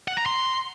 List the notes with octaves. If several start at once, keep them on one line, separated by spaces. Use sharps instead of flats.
F#5
A#5
C6